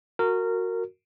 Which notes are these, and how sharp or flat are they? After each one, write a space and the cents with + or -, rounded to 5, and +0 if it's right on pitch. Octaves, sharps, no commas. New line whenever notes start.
F#4 -10 A#4 -20